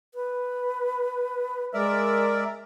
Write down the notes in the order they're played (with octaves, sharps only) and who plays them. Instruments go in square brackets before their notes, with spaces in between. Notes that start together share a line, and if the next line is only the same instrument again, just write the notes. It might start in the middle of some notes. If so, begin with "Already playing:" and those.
[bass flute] B4
[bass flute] G#3 [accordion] A#4 D5 E5